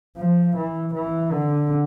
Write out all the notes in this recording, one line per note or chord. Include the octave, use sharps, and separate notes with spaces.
F3
E3
E3
D3